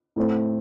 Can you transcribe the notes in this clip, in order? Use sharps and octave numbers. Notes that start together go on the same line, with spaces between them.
A2 A3 C4